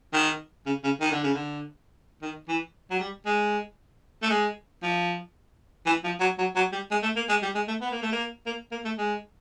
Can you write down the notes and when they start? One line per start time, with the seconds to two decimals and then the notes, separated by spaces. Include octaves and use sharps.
0.13 D#3
0.66 C#3
0.84 C#3
1.00 D#3
1.12 D3
1.24 C#3
1.34 D3
2.22 D#3
2.48 E3
2.90 F#3
3.00 G3
3.26 G#3
4.22 A3
4.30 G#3
4.82 F3
5.86 E3
6.04 F3
6.20 F#3
6.38 F#3
6.55 F#3
6.72 G3
6.91 G#3
7.02 A3
7.16 A#3
7.29 G#3
7.42 G3
7.55 G#3
7.67 A3
7.81 B3
7.91 A#3
8.02 A3
8.12 A#3
8.46 A#3
8.71 A#3
8.85 A3
8.98 G#3